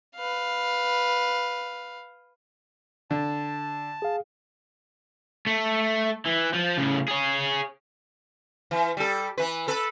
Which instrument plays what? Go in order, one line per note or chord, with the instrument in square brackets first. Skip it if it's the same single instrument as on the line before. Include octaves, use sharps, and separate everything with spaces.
[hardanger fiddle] B4 F5
[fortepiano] D3 [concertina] A5
[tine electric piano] G#4 F5
[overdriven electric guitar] A3
E3
F3
A2 C#3
G#4 C#5
[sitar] E3
G3 A4
E3 B4
A4 B4